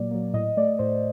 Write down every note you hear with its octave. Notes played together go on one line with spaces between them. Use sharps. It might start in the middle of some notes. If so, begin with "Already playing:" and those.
Already playing: A#2 F#3 A#3 D5
F#3 A#3
A2 D#5
A3 D5
A2 C5